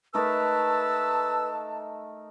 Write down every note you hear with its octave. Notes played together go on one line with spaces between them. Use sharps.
A3 D#4 A#4 B4 A5 E6